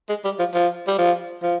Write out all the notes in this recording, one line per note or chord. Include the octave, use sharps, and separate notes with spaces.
G#3
G3
F3
F3
G3
F3
F3